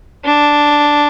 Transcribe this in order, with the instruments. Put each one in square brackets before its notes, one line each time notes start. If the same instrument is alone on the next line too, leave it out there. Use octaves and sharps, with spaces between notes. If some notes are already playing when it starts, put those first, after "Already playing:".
[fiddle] D4